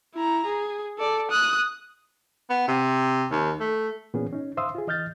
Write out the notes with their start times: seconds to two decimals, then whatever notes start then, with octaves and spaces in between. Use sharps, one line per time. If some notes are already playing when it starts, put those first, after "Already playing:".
0.14 E4 A#5
0.46 G#4
0.99 A4 D5
1.30 D#6 F#6
2.50 B3
2.68 C3
3.31 D#2
3.60 A3
4.14 A#2 E3 B3 C#4 G#4
4.33 C#4 D#4
4.57 C5 E5 F5 C6 D#6 E6
4.75 F4 G#4
4.87 E3 D#5 F6 G6 A6